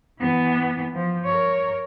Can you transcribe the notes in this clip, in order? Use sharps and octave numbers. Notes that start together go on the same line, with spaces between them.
E3 B3
F3
A#4 C#5